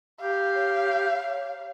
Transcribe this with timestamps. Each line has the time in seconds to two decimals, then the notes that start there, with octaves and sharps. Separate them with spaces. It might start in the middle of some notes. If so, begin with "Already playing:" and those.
0.21 G4 F5
0.55 C#5